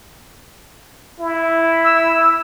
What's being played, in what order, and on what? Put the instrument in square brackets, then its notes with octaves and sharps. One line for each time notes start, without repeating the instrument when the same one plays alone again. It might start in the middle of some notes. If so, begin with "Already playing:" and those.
[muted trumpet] E4
[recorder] E6